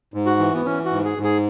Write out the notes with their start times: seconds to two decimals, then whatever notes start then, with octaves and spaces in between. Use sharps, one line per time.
0.14 G#2
0.26 F#4
0.39 E3
0.55 B3
0.66 E3 C#4
0.85 F#4
0.92 G#2
1.05 G#4
1.18 G#2
1.24 G#4